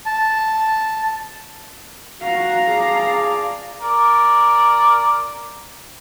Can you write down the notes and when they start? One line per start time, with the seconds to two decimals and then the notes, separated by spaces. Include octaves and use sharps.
0.06 A5
2.21 F#4 F5 A#5
2.69 G#4 D5 A5
3.82 A#4 D5